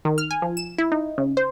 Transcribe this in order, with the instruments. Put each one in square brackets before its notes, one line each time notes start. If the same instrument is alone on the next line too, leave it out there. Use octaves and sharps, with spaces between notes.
[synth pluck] D#3
F6
G#5
F3
E7
E4
D#4
C#3
C5